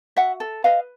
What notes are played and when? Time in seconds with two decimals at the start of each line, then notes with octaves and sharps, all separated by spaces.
0.17 F#4 E5 F#5
0.40 A4
0.64 B4 D#5 F5